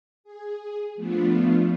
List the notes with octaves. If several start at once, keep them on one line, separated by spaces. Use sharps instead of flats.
G#4
F3 A3 B3 D4 F4